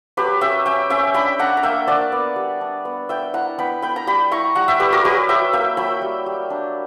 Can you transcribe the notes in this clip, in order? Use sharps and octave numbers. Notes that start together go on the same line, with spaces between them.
F#3 G4 B4
C#4 E5 G5
C#4 E5 G5
C#4 E5 G5
D4 G5 B5
D4 F#5 A#5
A#5
A#3 E5 G5
D4 D5 F#5
B3
G3
D4
B3
B3 E5 G5
E4 F#5 A#5
B3 G5 B5
B3 G5 B5
A#5
G3 G5 B5
E4 A#5 C#6
G3 F#5 A#5
E5 G5
G3 G4 B4
F#4 A#4
F#3 G4 B4
F#3 E5 G5
A#3 E5 G5
F#3 G5 B5
G3
G3
D4